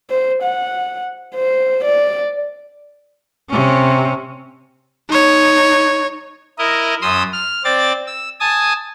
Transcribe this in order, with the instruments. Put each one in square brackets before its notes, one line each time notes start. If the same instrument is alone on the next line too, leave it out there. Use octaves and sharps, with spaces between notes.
[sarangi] C5
F#5
C5
D5
[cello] C3 C#4
[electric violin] D#4 C#5
[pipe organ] E4 A#4 D#5
F#2 C6 D#6 E6
F6
C4 D5 A6
E6
G#5 A5 D#6